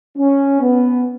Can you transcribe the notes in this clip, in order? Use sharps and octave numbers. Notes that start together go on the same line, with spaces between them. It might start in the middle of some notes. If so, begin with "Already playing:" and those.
C#4
B3